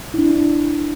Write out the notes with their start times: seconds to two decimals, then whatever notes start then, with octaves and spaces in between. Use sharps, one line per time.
0.14 E4
0.18 D4